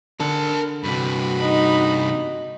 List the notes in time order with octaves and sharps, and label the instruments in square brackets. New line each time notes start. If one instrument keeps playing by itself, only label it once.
[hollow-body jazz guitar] D3 [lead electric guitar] A#4 A5
[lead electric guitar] G2 C3 [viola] F#4 B5
[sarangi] D#4